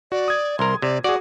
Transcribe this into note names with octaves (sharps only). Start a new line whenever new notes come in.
F#4 D5
D#6 G#6
C2 A#4 C6
C3 D5
F#4 G#4 D5 F#5